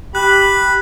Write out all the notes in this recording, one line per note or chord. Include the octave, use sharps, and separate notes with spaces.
G4 B5 F#6